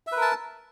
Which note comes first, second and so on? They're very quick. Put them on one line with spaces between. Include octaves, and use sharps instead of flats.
E5 B4 A#4 A5